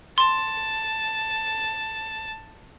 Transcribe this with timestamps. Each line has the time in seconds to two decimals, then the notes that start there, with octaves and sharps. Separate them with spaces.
0.18 A5 C6